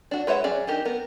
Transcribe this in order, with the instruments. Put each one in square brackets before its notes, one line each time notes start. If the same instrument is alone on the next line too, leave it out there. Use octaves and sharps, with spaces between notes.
[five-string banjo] D4 F#4
G#3 B4 C#5 E5 F#5
F#3 C#4 G#4 D5
D4 D#4 G4 A#4
B3 A#4